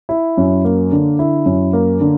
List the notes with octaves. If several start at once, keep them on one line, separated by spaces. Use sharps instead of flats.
E4
F#2
A#3
D3
E4
F#2
A#3
D3